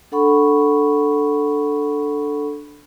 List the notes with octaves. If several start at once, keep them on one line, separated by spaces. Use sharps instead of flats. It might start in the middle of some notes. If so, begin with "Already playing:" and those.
D4 A4 F#5 B5 C#6